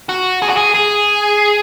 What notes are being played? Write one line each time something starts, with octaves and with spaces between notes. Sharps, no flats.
F#4
G#4
F#4
G#4
G#4